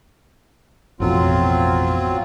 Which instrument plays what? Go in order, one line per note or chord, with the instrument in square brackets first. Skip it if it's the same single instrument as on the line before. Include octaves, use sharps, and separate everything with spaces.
[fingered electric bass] A1 F2 B2 [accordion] F#3 C4 F4